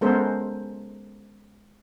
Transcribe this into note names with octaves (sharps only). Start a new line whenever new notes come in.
G#3 B3 C#4 A4 A#4 C5